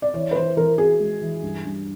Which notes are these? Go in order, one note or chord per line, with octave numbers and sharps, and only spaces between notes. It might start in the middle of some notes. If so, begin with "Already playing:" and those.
D5
E3 C#5
B4
E3 C5
E3 A#4
F#4 G#4
G#3
E3
G2
G2